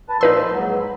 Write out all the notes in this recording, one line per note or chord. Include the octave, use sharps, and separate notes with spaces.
B4 A5
A#2 F3 D#4 B4 C6 E6
G#2 F#3
B5